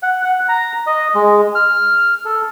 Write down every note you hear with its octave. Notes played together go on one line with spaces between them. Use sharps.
F#5
F#5
A#5
D#5
G#3
F6
A4